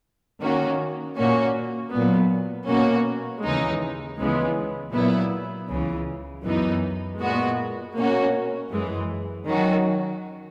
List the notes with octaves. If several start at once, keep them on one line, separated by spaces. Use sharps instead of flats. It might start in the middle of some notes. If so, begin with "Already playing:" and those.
D#3 A#3 C#4 F#4
A#2 A#3 C#4 F#4
A#2 F#3 B3
B2 A#3 C#4 F#4
D#2 C#3 E3 G#3 D#4
C#2 C#3 E3 G#3 B3
A#2 F#3 B3 E4
C#2 C#3 E3
F#2 E3 B3 D#4
A#2 G#3 B3 F#4
B2 A#3 C#4 F#4
F#2 E3 G#3
D#3 F#3 C#4 F#4